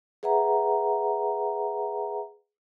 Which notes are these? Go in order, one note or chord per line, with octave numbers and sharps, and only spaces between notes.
G#4 B4 E5 F#5 A#5